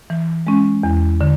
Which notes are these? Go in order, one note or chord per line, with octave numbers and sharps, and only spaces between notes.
E3
G#3 C#4
E2
D3